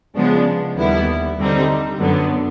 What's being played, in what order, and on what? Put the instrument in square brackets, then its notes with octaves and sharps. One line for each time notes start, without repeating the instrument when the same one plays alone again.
[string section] C#3 F3 G#3 B3 D4
D#2 D3 G3 B3 E4
D3 G3 C4 D#4
F#2 D3 F#3 B3